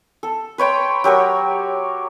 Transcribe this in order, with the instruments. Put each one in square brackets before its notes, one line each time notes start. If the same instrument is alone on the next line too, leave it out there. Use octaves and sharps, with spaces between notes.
[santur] A4
B4 C#5 G5 C6
F#3 G4 A#4 C#5